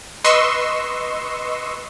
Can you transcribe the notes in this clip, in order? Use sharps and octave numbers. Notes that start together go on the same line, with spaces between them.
B4 D#5 C6 C#6 E6